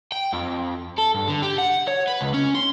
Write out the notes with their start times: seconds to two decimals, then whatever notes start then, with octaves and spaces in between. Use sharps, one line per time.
0.12 G5
0.33 F2
0.98 A4
1.14 G2
1.28 D3
1.42 G4
1.58 F#5
1.88 C#5
2.08 B4
2.21 C#2
2.34 C#4
2.55 C6